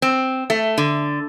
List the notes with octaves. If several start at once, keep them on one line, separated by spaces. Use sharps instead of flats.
C4
A3
D3